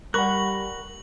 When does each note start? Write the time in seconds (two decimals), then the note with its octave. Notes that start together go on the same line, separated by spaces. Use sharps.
0.14 G3 A#4 F#5 B5 C#6 F#6 F#7